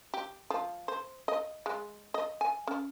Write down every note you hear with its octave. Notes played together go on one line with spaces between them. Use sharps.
G4
F3
C5
D#5
G#3
D#5
G#5
C#4